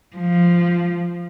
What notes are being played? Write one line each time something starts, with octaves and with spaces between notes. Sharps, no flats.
F3